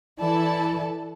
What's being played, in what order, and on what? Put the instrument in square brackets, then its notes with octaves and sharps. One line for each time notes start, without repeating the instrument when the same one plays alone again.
[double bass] E3 [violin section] E4 A4 D5 A5